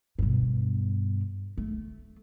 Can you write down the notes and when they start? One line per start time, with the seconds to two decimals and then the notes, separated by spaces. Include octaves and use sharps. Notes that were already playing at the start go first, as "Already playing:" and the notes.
0.19 G2 B2
1.57 A3